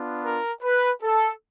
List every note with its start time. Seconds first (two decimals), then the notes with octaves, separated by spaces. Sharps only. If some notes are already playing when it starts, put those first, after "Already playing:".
Already playing: B3 D4 F4
0.24 A#4
0.63 B4
1.03 A4